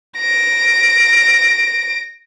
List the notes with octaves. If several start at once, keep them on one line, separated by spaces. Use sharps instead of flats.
A#6 D7